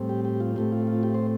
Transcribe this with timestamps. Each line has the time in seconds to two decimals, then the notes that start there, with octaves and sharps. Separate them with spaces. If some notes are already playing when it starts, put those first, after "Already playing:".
Already playing: A2 G3 C4
0.09 G4
0.25 G4
0.40 F4
0.56 A2 A3 C4 G4
0.72 F4
0.87 F4
1.03 G4
1.14 C5